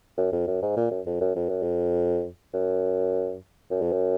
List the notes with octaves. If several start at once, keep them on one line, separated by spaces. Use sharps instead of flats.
F#2
F2
F#2
G#2
A#2
F#2
F2
F#2
F2
F#2
F2
F#2
F#2
F2
F#2